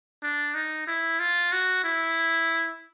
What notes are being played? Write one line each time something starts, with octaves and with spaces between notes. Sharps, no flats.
D4
D#4
E4
F4
F#4
E4